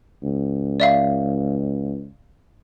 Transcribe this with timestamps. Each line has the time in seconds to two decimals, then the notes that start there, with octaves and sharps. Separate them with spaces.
0.23 C#2
0.80 D5 E5 F5